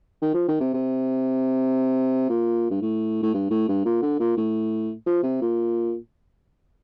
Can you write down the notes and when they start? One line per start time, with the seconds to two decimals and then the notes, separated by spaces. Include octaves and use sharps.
0.22 D#3
0.34 F3
0.48 D#3
0.60 C3
0.74 C3
2.29 A#2
2.71 G2
2.82 A2
3.23 A2
3.34 G2
3.50 A2
3.69 G2
3.85 A#2
4.02 D3
4.20 A#2
4.37 A2
5.06 F3
5.23 C3
5.42 A#2